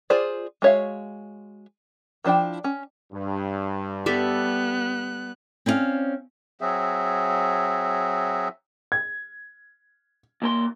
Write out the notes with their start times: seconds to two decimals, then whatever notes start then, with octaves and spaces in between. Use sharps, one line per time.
0.10 F4 G#4 C5 D5
0.62 G#3 F#4 C#5 E5 F5
2.24 D#3 F3 D4 E4 G5
2.64 C#4
3.12 G2
4.06 G3 B3 A4 E5 F#6
5.66 C4 C#4 E4 D5 F5
6.61 F#3 C4 G#4 E5
8.92 G#6
10.42 D#2 A#3 C6